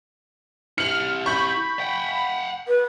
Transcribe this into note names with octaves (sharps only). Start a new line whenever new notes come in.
E4 G4 F6 C#7 F#7
B5 C#6 G6
F#5 G5
B4